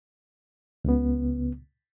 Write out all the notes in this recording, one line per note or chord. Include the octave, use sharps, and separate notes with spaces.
C#2 C#3 B3